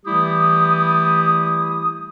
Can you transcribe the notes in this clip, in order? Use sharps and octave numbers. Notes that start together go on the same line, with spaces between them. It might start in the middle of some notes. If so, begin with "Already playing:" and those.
E3 G3 A3 E4 G4 D#6